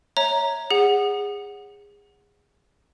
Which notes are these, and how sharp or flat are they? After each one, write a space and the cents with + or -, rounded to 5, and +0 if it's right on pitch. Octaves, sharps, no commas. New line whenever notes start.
C#5 +0 E5 -20 A#5 +0
G#4 -25 F#5 +0